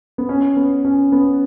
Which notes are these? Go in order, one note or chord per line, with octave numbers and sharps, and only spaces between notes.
B3
C#4
B3
C#4
B3